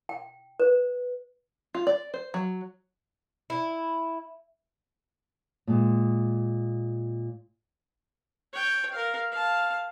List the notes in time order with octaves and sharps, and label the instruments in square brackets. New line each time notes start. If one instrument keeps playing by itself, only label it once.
[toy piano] G5
B4
[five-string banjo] F4
D5
C5
F#3
[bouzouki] E4
[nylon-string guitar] A#2 G#3
[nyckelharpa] C#5 G5
A#4 F5
F5 A5